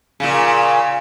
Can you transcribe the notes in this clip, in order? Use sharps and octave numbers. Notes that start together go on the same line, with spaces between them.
A#2 C#3